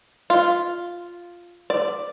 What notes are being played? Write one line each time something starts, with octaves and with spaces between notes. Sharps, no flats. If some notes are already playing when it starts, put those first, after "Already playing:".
F4
D5